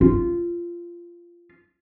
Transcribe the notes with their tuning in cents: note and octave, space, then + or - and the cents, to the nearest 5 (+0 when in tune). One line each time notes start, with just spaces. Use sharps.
F4 -15